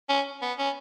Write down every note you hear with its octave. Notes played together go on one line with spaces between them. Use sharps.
C#4
B3
C#4